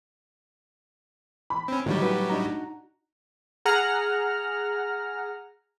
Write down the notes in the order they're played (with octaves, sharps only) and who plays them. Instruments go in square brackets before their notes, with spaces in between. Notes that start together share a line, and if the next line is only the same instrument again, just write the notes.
[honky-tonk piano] B5
[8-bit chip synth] C4 C#4
[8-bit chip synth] A2 F#3 G3 [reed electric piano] D3 [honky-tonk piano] D#3
[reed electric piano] C#4 G4 B4 [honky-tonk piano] F#4
[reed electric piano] D4 D#4 A#5
[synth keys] G#4 F#5 A#5 F6